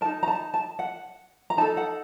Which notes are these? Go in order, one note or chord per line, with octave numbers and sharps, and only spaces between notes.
A#4 A5
D#4
A#5
A5
A5
F#5
A#5
D#4 A4 A5
F#5